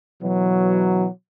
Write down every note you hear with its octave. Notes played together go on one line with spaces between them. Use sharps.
B2 E3 F#3